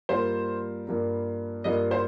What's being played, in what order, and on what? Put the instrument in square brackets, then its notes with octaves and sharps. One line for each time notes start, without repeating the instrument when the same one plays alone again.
[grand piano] G2 G3 A#3 F4 A#4 [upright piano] C5
[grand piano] G2 G3 A#3 F4 A#4
[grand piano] G2 G3 A#3 F4 A#4 [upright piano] D#5
[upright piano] C5